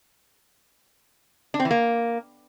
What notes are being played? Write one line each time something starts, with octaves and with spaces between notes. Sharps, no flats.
D4
C4
E3
A#3